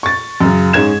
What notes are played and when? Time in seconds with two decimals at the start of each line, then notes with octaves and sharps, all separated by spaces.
0.03 C#6 A6
0.41 F#2 C#3
0.73 G#2 C#4 G#4 G#6 E7